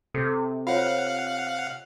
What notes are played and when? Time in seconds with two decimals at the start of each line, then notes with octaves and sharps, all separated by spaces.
0.14 C3 A4
0.67 F4 C5 C#5 F5 F#5